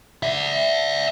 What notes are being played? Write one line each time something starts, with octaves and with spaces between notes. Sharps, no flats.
D5 E5